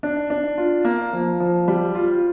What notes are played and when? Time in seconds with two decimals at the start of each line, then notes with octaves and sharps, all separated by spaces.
0.03 D4
0.30 D4
0.58 F4
0.85 A#3
1.13 F3
1.40 F3
1.68 G3
1.95 F4